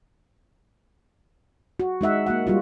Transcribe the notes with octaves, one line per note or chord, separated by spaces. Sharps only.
F#4
G#3 D#4 E5 F#5
A#3 F#4 F#5
G3 F4 F#4